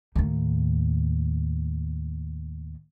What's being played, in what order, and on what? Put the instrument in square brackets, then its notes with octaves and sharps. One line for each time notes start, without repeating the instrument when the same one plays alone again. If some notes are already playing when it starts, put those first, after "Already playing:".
[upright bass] D#2 A2